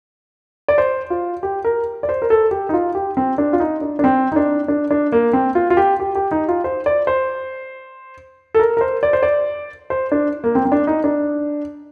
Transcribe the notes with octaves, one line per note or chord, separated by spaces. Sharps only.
D5
C5
F4
G4
A#4
D5
C5
A#4
A4
G4
D#4
F4
G4
C4
D4
F4
D#4
D4
D4
C4
D#4
D4
D4
D4
A#3
C4
F4
F4
G4
G4
G4
D#4
F4
C5
D5
C5
A4
A#4
A#4
C5
D5
C5
D5
C5
D4
A#3
C4
C4
D4
D#4
D4